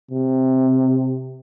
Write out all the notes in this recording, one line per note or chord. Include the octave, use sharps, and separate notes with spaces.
C3